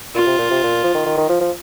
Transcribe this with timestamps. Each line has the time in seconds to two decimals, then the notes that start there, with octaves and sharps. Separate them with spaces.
0.15 A#2 F4
0.26 C3
0.38 A#2
0.51 C3
0.63 A#2
0.84 F3
0.94 D#3
1.06 D#3
1.17 D#3
1.29 F3
1.41 F3